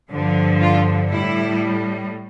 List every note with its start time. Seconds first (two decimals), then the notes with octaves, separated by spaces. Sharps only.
0.11 G2 D3 F3
0.61 F4
1.11 A2 G3 E4